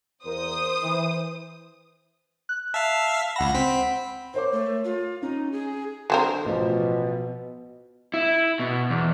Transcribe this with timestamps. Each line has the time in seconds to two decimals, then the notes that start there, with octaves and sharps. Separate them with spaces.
0.24 E2 A#4 C5 D#6
0.82 E3
2.49 F#6
2.74 E5 F5 A5
3.36 C#2 F#5 B5 A#6
3.54 C4 B6
4.34 A#4 C5 C#5 D6
4.52 A3
4.84 F4
5.22 C#4 D#4
5.52 G#4
6.10 D3 F#3 C4 A#4
6.45 A1 B2 F3
8.14 E4
8.59 B2
8.90 E2